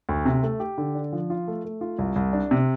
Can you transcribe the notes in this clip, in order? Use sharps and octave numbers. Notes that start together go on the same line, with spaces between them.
D2
C3
A3
G4
D3
D4
F3
F4
A3
A3
F4
C2
C2
D4
C3